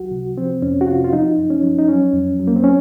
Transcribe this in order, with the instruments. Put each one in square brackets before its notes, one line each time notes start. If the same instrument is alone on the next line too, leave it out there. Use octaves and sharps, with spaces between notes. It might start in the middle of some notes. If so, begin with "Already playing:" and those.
Already playing: [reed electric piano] C#2 F#3 F#4
C3
F3 C4
F2 C#4
F#4
C3 F4
F4
F3 D#4
F#2
C#4
F3
D#4
F#3 C#4
F2
F#3
A#3
C4
C#4